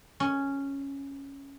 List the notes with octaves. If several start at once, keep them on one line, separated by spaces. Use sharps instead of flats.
C#4